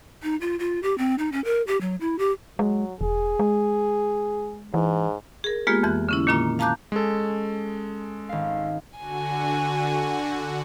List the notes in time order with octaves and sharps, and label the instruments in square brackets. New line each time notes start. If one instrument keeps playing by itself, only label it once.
[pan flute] D#4
F4
F4
G4
C4
D#4
C#4
A#4
G4
F#3
E4
G4
[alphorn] F#3 [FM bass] G#3
[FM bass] E1 [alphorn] G#4
[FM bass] G#3
[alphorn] G#2 [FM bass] E3
[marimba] G#4 A#4
G#3 A#3 B3 F4 G4 G#4
F2 E3 F#6
D3 C#4 E4
A#2 D#3 A#3 D4 F4 A#5
F5 A5 A#5 D6 F#6 G6
[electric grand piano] G#3 A4 [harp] C#4
[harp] G#1 F5
[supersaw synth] D3 F#4 [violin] G#5